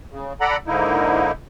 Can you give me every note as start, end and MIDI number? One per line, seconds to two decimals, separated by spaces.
0.11 0.33 49
0.41 0.57 69
0.41 0.57 74
0.41 0.57 78
0.41 0.57 82
0.41 0.57 83
0.67 1.32 44
0.67 1.32 50
0.67 1.32 58
0.67 1.32 63
0.67 1.32 64